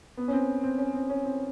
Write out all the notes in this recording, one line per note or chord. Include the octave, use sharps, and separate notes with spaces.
B3
C#4
C4
C4
C#4
C4
C#4
C4